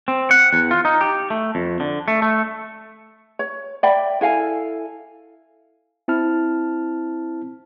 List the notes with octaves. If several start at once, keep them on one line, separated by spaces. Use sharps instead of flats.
C4
F#5
E2
F4
D#4
G4
A3
F2
D3
A3
A3
C#5
D5 E5 G5 B5
E4 A4 F5 G#5
C4 E4 A5 F6